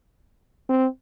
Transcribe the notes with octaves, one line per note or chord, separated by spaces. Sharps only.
C4